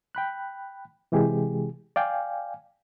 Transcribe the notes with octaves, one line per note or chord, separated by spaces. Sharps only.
G5 B5 F#6
C3 E3 G#3 G4 G#4
D5 F5 G5 G#5